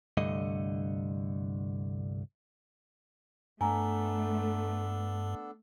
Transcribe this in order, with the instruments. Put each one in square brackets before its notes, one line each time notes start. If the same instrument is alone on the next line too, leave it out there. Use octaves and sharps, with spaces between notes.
[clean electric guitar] C2 G2 D3 A3 D#5
[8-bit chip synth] G2 [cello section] A3 [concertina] B3 D4 A4 [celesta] G#5 A#5